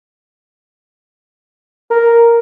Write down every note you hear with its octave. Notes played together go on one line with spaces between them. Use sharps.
A#4